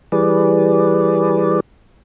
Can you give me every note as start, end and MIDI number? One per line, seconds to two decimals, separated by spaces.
0.12 1.60 52
0.12 1.60 55
0.12 1.60 68
0.12 1.60 71
0.12 1.60 74